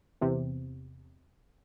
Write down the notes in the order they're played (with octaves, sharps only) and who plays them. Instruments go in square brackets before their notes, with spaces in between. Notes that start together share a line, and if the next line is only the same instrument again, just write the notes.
[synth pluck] E2 C3